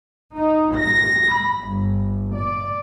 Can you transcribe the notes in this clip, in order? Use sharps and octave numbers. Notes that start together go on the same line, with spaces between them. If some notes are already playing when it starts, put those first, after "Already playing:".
D#4
A#6
B5
G1
D5